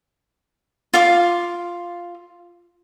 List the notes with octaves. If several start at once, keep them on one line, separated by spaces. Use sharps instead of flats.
F4 F5 D6